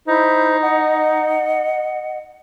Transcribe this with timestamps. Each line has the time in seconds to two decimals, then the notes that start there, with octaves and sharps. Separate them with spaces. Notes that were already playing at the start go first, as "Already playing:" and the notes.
0.08 D#4 E4 C5 G6
0.62 D#5 F#5